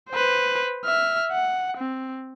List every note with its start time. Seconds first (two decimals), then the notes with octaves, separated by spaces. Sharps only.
0.10 B4 C5
0.85 E5 F6
1.32 F#5
1.78 C4